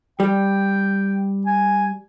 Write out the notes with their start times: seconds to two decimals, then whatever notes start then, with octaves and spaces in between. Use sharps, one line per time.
0.20 G3 G5
1.46 G#5